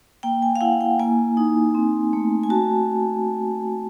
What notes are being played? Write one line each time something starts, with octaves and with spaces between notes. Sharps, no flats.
A#3 G5
G#5
F5
E4 F#5
G5
A#3 G#5
D#4
C4
A3
G#5
F#4 A5